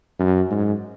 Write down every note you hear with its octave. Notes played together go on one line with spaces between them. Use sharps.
F#2
G#2